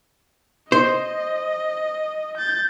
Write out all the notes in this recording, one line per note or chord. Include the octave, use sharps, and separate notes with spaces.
C5 D#5
G6 A6